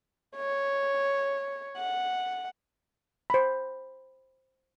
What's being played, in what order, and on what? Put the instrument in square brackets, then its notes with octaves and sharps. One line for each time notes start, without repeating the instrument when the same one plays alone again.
[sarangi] C#5
F#5
[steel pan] C5 B5